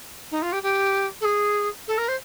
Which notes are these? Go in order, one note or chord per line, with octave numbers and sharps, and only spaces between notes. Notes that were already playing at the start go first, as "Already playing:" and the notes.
D#4
F4
G4
G4
A4
G#4
A4
A#4
C5